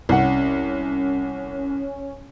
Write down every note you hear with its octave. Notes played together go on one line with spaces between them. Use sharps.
C2 C#4 F#5